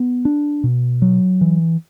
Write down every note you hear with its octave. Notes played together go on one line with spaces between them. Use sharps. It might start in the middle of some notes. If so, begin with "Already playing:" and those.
Already playing: B3
D4
B2
F#3
E3